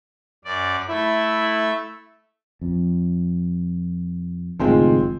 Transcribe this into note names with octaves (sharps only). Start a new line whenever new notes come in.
F#2 D5
A3 E4 E5
F2
F#1 A2 D#3 G#3 C4 F4